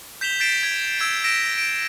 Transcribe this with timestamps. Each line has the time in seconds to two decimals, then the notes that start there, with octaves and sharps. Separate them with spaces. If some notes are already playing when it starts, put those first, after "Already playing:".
0.21 G6 B6 E7 F7 G7
0.40 G6 A6 B6 C7 D7 E7
0.63 G#6
0.99 E6 G6 G#6 B6 D7 E7
1.24 E6 A#6 B6 D7 E7
1.58 D7